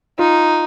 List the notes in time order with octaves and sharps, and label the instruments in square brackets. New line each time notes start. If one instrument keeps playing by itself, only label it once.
[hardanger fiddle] D#4 [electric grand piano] F4